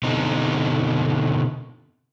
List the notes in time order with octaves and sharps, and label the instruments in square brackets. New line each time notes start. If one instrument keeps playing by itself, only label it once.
[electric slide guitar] B2 D3 C4 D#4